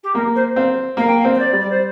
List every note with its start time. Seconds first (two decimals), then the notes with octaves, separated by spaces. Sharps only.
0.03 G4
0.15 A#3 A#4
0.35 C5
0.56 C4 F5
0.97 A#3 F5
1.07 G5
1.18 F5
1.25 C4
1.34 C5
1.39 D5
1.53 G3
1.60 D5
1.70 C5